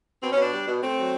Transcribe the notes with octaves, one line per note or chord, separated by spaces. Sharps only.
B2 C4
C#4
B2
D4
G3
B2
A3 C4
F#3